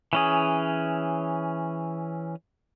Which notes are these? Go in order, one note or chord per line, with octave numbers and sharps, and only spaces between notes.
E3 C#4 G#4